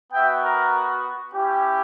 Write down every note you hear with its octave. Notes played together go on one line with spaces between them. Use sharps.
B3 F#4 E5 G5
A#4
C#4 E4 G4